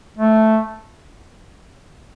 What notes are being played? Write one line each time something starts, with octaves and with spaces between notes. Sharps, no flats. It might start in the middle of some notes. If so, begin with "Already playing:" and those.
A3